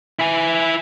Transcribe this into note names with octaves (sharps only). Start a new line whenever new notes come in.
E4 G#5